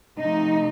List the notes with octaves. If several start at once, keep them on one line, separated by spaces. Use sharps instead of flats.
C3 F3 A3 D#4